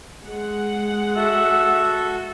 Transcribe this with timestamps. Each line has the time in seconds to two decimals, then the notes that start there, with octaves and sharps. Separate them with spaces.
0.24 G#3 F#5
1.16 F#4 A4 E5